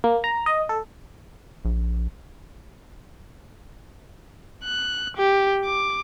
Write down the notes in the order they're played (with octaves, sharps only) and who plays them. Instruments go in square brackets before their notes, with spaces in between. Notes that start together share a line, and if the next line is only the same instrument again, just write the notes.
[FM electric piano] A#3
A#5
D#5
A4
[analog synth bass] A#1
[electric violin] F#6
G4
D6